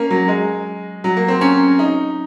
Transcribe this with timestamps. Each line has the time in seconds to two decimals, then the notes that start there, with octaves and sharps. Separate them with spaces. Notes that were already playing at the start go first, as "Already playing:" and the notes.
Already playing: A#3 C#4
0.10 F#3
0.28 G#3
1.04 F#3
1.17 A#3
1.28 C4
1.41 C#4
1.79 D#4